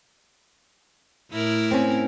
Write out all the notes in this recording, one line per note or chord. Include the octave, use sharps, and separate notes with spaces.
A2 E4 A#4
C4 C#4